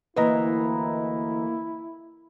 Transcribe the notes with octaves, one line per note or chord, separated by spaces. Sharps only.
D2 E3 A#3 E4 B4 D#5 A#5